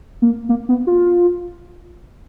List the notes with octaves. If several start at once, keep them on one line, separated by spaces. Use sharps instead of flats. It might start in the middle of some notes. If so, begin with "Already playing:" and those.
A#3
A#3
B3
F4